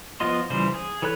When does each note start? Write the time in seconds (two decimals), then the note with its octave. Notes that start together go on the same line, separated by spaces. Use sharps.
0.20 F3 B3 F4 D#5 C6
0.50 C#3 E3 F3 G3 C5
0.74 G#4
1.02 E3 A4 C#5 B5 F#6